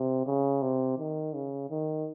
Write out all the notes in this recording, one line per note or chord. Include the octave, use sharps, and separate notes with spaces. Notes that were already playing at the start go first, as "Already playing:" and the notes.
Already playing: C3
C#3
C3
D#3
C#3
D#3